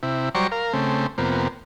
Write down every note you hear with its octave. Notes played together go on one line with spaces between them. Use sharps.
C3 E4
F#3 G3 C5 D5 A#5 C#6
A#4 F5
C#3 A3 C4
F2 C3 A#3 B3